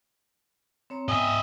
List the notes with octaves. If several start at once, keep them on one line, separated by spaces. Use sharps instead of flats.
C4 C#5 A#5
B3 D#5 E5 G5 G#5